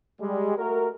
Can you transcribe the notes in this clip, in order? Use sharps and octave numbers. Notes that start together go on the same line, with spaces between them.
G3 G#3
A3 F#4 A#4